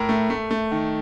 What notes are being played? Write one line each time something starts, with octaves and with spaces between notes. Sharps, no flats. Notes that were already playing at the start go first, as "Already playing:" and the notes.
Already playing: A2 A#4
A3
A3
A3
D#3